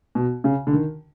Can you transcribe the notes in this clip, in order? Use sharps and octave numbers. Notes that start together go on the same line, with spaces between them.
B2
C#3
D3
D#3